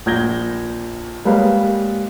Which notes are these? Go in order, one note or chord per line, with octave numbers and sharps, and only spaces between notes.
A#1 G6 G#6 A#6 G7
G3 G#3 A#3 B4 C#5 F5